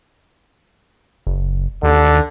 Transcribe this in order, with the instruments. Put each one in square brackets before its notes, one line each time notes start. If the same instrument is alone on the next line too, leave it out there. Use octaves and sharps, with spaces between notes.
[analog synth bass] F#1
[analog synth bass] D#2 [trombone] D3